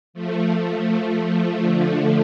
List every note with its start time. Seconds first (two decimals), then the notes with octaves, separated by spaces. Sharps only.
0.14 F3 A3
1.28 F3 A3
1.57 D3 F3
1.86 D3